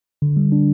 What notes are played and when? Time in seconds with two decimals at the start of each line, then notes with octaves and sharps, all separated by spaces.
0.22 D3
0.37 G3
0.52 D4